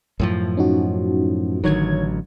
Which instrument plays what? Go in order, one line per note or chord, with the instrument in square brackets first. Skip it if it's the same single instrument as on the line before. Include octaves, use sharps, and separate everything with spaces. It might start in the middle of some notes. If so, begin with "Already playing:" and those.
[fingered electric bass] F#2 A2 F3
[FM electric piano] C#4 D#4 F#4
[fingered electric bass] A1 D3 F#3 [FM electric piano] D#3 C#5 G#6